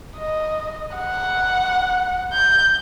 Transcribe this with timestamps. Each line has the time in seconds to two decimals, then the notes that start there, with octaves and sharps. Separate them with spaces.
0.17 D#5
0.96 F#5
2.33 G6